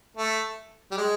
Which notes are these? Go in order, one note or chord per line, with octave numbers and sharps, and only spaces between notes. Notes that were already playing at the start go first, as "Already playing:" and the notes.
A3
G3
G#3